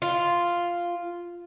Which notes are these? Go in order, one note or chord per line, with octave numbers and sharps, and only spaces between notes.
F4